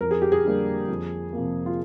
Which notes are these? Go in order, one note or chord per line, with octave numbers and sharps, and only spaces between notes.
F2 A#4
G#4
G4
G#4
D3 G3 A#3
F2
C3 F3 A#3
F4